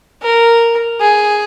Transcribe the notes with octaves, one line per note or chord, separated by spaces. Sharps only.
A#4
G#4